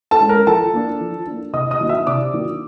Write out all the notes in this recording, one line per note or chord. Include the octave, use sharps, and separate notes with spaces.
A4 A5
G#3 C#4
A#4 A#5
F3 A4 A5
A#3 D4
F3
A#3 D4
C3 D#5 D#6
D#5 D#6
D#3 F#3 A#3 D4
E5 E6
C3 D5 D6
D#3 F#3 A#3 D4